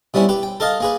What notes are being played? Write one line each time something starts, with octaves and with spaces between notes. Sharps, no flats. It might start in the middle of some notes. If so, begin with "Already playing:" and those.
C3 G3 B3 C#4 E4
G4 B4
G5
A4 A#4 D#5 F5 A5
A#3 G#4 B4